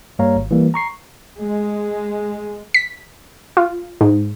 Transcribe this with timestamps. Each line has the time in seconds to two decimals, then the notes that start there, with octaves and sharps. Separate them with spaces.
0.19 G2 G3 A#3 C#5 F5 A#5
0.36 G#1
0.51 E3 G3 A#3
0.74 A#5 C#6 C7
1.40 G#3
2.74 B6
3.57 F4
4.01 G#2